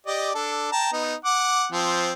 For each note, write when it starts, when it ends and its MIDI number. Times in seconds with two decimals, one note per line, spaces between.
0.07 0.30 67
0.07 0.30 74
0.07 0.30 75
0.35 0.70 62
0.35 0.70 69
0.72 0.91 79
0.72 0.91 81
0.72 0.91 82
0.93 1.14 59
0.93 1.14 63
1.25 1.67 78
1.25 1.67 86
1.72 2.12 53
1.72 2.12 60